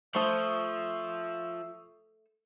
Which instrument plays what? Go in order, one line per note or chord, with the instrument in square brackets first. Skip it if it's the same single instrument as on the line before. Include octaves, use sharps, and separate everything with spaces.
[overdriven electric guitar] F3 [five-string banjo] A3 C5 [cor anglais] E5 [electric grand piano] C#6 D#6